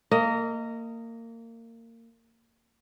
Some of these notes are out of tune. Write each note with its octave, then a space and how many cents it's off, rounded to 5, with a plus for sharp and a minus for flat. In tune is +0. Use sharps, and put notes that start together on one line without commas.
A#3 -25 D#5 +0